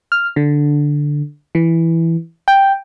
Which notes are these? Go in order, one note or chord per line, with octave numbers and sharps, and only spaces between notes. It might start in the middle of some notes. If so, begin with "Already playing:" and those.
F6
D3
E3
G5